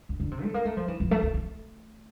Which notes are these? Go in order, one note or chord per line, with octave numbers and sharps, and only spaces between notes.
D3
D3
C3
A3
A#3
A3
F3
E3
F3
A3
A3
A3